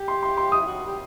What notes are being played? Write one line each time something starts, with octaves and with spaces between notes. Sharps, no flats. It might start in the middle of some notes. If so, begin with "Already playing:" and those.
Already playing: G4
C6
C6
C6
D#6
E4
F#4
G4